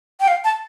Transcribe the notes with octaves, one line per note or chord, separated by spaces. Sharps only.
G5
F5
A5